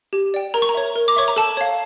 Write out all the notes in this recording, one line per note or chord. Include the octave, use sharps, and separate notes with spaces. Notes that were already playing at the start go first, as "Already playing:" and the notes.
G4
D5 G5
A#4 A#5
C#6
A#5
C#5 E5
A#4
D6
C#5 E5 C#6
A#5
A4 A5
C#5 F5